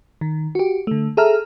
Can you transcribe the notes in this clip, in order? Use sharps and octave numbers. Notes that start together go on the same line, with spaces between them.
D#3
F#4 G4
D3 A3
G#4 A4 E5 A#5 F6